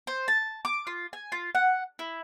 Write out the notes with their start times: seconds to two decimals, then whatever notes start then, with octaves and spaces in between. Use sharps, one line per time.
0.07 C5
0.28 A5
0.65 D6
0.87 F4
1.13 G#5
1.32 F4
1.55 F#5
1.99 E4